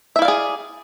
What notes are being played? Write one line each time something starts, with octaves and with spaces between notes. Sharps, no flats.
E4 G#4 D5 E5 F5